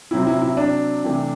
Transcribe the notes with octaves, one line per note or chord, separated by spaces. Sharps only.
C3 F#3 C4 E4
E4
E4
D4
C3 E3 A3